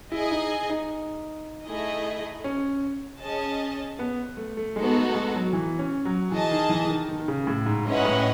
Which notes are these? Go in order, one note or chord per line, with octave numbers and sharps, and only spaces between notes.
E4 G#4 D#5 G#5
D#4
D#4
A3 E4 G#4 D#5
C#4
C#4 G#4 D#5 A5
B3
A3
A3
G#3 B3 D#4 F#4 A4
A3
G#3
F#3
E3
C#4
F#3
E3 G#4 D#5 A5
D#3
E3
E3
D#3
D#3
D#3
C#3
A2
G#2
G#2 C#4 E4 B4 D#5 F#5
A2